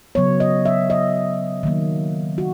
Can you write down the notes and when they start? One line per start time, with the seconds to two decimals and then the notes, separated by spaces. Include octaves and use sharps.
0.15 C#3 F#3 B3 C#5
0.40 D#5
0.66 E5
0.90 D#5
1.63 D#3 F#3 A#3
2.38 F#4